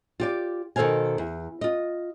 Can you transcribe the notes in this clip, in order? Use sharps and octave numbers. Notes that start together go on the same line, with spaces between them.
F4 G4 D5
B2 D#3 A4 C5 F5 G#5
E2
F4 D#5